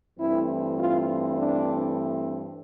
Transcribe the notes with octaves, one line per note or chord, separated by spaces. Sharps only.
G2 E3 A3 C4 E4
F4
D4